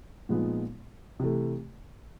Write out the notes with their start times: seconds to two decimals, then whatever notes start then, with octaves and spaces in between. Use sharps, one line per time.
0.29 A#2 F3 G#3 B3 D#4
1.20 C3 E3 A3